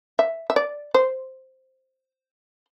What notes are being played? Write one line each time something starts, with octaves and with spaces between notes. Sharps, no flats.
E5
E5
D5
C5